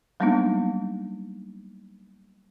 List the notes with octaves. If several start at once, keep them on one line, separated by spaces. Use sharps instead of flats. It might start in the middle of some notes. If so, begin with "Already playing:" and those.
F#3 G3 A#3 B3 D4 D#4